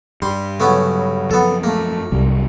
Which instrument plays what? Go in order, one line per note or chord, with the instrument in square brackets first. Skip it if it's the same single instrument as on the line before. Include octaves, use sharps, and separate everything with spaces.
[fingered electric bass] G2 [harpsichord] G3 C6
[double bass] C#3 F#3 [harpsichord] A3 B3 C#4
[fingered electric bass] F#2 F3 [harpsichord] B3 A4
[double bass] A3 [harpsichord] A#3
[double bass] C2 [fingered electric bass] F#2 C3 G3